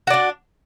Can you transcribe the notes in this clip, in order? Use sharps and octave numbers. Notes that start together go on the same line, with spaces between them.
D4 F#4 D5